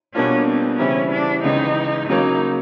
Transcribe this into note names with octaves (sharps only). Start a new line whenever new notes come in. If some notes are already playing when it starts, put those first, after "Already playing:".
B2 G3 A#3 C#4 D4 F4
C4
C#3 E3 G3 C4 C#4 E4
D4
C#2 C#3 E3 D#4
C#3 F#3 A#3 C#4 D#4